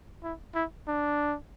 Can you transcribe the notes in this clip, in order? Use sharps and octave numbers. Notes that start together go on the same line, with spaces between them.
E4
E4
D4